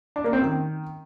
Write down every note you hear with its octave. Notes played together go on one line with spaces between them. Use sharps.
D4
A#3
C4
D#3